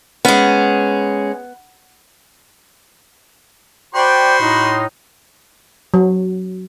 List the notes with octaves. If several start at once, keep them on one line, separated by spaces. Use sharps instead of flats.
G#3 B3 C#4
F#4 C5 D5 G5 B5 C6
A2 D#4
F#3